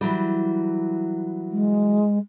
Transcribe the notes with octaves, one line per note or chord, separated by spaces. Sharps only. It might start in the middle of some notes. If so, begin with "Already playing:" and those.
E3 F#3 G3
G#3